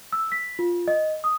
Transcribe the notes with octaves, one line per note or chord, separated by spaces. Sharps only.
E6
B6
F4
D#5
D#6